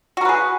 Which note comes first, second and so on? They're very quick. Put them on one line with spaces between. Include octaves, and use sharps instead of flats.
F#4 A#4 B4 G#4